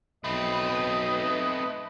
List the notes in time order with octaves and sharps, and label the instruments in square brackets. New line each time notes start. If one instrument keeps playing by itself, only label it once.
[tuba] B1 [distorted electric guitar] A3 C4 [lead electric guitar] B4 [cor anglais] D#5